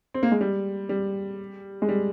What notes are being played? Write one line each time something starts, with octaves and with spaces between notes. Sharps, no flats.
C4
A#3
G#3
G3
G3
G#3
G3